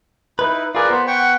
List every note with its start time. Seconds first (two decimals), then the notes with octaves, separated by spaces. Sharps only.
0.39 D#4 E4 B4
0.75 F4 G#4 A#4 B4 D5
0.90 B3 C5
1.07 F#5 G5 C#6